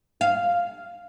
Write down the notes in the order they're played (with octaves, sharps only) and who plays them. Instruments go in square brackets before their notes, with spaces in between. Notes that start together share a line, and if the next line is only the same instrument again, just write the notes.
[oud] F5